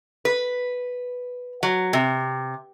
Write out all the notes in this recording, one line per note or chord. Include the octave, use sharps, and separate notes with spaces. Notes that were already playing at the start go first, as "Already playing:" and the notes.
B4
F#3
C3